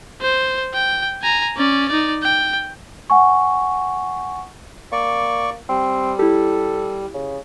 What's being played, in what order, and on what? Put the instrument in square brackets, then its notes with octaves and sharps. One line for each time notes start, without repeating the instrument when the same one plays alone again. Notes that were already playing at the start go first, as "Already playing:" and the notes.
[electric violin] C5
G5
G#5 A#5
C#4 D5
D#4 D5
G5
[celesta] F#5 G#5 C#6
[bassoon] A#3 [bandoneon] D5 C#6
[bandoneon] G3 [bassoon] C4
[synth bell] E4 G4 [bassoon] A4
[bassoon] C#3